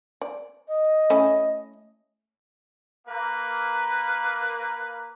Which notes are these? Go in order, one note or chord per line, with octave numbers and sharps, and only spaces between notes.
D5
D#5
A3 C#4 E4
A#3 B4